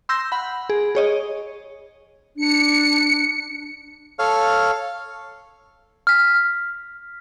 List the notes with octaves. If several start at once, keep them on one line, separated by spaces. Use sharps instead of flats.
C6 E6 G6 A#6
F#5 B5
G#4
G#4 C#5 D#5
D4 C#7
A4 C#5 F5 F6
F6 B6